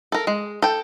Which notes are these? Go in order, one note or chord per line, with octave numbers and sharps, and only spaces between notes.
A4 A#4
G#3
A4 G5